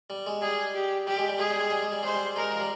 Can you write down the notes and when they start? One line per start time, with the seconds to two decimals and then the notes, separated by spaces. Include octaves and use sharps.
0.10 G3
0.26 G#3
0.42 G3 G#4
0.74 G4
1.07 G3 G4
1.18 G#3
1.28 G3
1.39 G#3 G#4
1.50 G3
1.60 G#3
1.71 G3
1.82 G#3
1.92 G3
2.03 G#3 C5
2.14 G3
2.36 G#3 A#4
2.51 F3
2.60 G3